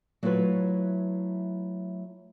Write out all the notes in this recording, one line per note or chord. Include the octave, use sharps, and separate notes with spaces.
F#3 A3 E4 F4 B4 C#5